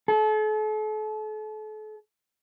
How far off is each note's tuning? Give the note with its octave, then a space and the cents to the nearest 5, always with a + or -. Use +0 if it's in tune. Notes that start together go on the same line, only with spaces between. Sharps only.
A4 -40